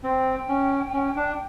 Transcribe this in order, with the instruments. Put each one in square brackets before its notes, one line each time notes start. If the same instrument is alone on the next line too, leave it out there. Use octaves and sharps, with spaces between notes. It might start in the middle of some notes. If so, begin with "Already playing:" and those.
[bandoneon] C4 [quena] G5
[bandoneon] C#4
C#4
D4